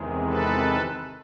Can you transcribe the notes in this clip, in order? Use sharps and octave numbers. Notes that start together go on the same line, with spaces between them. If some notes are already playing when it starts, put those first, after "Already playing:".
Already playing: E2 C3 D#3 G#3
A4 B4